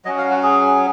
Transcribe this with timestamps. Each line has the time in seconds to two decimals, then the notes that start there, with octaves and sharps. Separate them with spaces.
0.05 F#3 C#4 F#4 D#5
0.18 F5
0.31 F#4
0.43 G#4